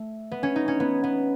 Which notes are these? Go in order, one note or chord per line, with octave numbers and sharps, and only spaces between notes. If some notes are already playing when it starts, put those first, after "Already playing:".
Already playing: A3
B3
C#4
D#4
C#4
B3
B3